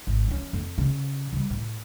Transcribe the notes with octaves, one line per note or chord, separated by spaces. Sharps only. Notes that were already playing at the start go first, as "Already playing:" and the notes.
G#1
F3 C#4
F2
C#3
C#3 G3
A2